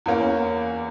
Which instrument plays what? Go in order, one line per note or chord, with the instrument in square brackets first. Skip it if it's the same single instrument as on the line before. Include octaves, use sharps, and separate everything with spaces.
[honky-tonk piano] E2 E3 A#3 C#4